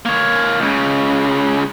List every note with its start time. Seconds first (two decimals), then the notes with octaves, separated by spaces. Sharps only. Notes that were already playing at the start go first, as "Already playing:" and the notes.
0.06 A#3 C#5
0.60 C#2 C#3